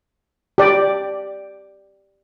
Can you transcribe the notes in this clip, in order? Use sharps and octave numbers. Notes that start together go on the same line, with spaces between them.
G4 D5